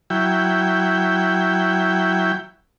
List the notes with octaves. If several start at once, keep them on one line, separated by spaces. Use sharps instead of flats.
F#3 E4 G5